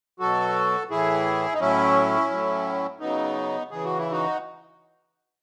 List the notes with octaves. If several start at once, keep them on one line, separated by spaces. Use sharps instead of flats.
B2 F#3 F#4 A4
A2 E3 E4 G#4
D#4
A2 F#3 C#4 E4
A2 F#3
C#3 F#3 B3 D#4
C#3 E3 G#4
F#4
E4
D#4 F#4